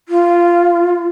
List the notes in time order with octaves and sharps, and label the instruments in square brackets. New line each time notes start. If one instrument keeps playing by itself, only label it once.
[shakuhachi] F4